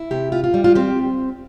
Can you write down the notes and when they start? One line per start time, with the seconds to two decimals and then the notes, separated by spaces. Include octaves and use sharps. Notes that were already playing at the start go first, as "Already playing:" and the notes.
Already playing: E4
0.11 C3 G4
0.32 F4
0.44 F4
0.54 G3
0.64 F4
0.75 C4 G4